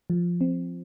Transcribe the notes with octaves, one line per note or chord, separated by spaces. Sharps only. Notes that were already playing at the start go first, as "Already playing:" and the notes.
F3
C4